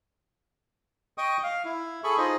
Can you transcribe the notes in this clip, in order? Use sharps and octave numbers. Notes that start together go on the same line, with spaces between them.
D#5 G5 C#6 D#6
F5
E4
G#4 A4 B5 C#6
D#4 F4 G#4 C5 D#5